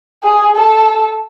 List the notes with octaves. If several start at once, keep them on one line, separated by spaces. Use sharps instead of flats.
G#4
A4